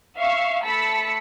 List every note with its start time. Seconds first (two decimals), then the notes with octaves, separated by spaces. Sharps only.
0.17 E5 F5 C#6
0.63 A3 A5 B5 E6 B6 C#7